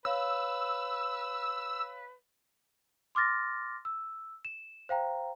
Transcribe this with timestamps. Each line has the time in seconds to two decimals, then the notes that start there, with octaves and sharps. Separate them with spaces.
0.05 B4 C#5 F5 E6
3.15 C6 D6 F6 A6 A#6
3.85 E6
4.45 E7
4.89 C5 F5 G5 A#5